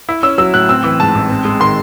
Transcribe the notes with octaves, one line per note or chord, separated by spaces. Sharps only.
E4
C#4 E6
F#3 E6
A2 F#6
C4 E6
E3
G#2 A5
A1
C4
G#3
D#3 C6